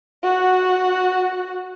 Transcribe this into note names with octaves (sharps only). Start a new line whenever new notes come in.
F#4 F#5